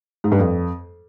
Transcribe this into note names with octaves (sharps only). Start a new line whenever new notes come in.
G#2
G2
F2